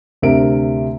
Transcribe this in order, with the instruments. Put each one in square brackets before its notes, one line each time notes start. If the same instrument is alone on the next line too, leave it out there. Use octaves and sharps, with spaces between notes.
[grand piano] D2 C3 D4 A#4 E5 D7